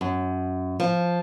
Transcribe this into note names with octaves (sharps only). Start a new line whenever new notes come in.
F#2
F3